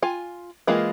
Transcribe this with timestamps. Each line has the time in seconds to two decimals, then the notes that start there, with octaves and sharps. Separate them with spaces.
0.02 F4 G#5
0.67 E3 G#3 A#3 F4